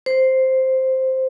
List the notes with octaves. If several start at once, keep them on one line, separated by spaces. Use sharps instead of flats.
C5